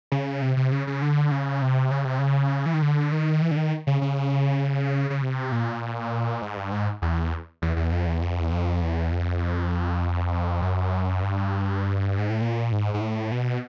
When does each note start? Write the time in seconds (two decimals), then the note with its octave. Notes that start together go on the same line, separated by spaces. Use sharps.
0.12 C#3
0.42 C3
0.57 C3
0.72 C#3
0.87 C#3
1.02 D3
1.31 C#3
1.62 C3
1.91 C#3
2.05 C3
2.19 C#3
2.66 E3
2.74 D#3
2.82 D3
3.12 D#3
3.42 E3
3.51 D3
3.56 D#3
3.87 C#3
4.01 C#3
5.10 C#3
5.22 C3
5.52 A#2
6.42 G#2
6.57 G2
6.72 G#2
7.02 E2
7.62 E2
7.76 E2
7.92 F2
8.06 E2
8.21 F2
8.40 E2
8.51 F2
8.82 E2
9.12 F2
10.61 F#2
11.22 G2
12.18 G#2
12.30 A2
12.41 A#2
12.72 G#2
12.94 G#2
13.01 A2
13.32 B2